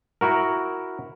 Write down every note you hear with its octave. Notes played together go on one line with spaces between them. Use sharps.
E4 F#4 A#4